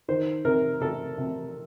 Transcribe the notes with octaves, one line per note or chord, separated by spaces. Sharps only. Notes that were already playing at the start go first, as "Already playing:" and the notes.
D#3 C5
C3 A#4
C3 A4
C3